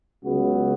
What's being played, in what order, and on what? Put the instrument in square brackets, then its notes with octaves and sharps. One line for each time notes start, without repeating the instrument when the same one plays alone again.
[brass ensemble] C#2 C#3 F#3 B3 F#4